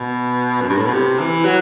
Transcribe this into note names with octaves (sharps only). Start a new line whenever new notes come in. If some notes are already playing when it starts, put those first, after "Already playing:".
Already playing: B2
F#2
G2
A2
B2
C3
E3
F#3